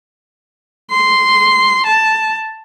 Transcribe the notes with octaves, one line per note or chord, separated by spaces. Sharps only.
C6
A5